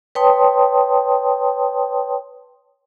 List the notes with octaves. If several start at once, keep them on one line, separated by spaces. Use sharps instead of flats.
B4 C#5 G5 A5 C6 D#6